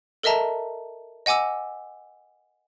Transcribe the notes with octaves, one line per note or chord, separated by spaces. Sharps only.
A4 A#4 D#5 E5 A5 A#5
D#5 F#5 G#5 D6 E6